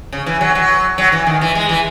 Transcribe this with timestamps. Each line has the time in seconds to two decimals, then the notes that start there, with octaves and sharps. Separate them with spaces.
0.13 C#3
0.26 E3
0.41 F#3
0.55 F#3
0.98 F#3
1.12 E3
1.26 D#3
1.41 E3
1.55 G#3
1.69 E3